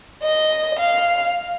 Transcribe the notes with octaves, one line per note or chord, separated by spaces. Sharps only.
D#5
F5